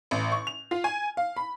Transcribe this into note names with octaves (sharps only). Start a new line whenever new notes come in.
A1
C#6
F7
F4
G#5
F5
B5